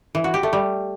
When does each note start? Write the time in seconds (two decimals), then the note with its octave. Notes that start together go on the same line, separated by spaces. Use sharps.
0.15 E3
0.24 F#4
0.34 G4
0.43 A3
0.53 G3